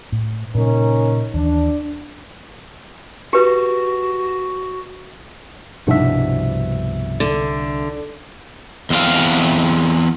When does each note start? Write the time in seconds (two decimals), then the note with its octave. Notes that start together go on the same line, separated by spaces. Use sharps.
0.12 A2
0.55 A#2 C#3 F#3 C#4 D#4 A#4
1.34 D#2 E3 D4
3.33 F#4 G4 B4
5.87 C2 G2 B2 F3 G3 D4 D#4 E5
7.20 D3
8.90 E2 C4 F5